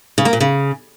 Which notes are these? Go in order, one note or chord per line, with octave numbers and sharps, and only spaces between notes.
C#3
A#3
A#2
C#3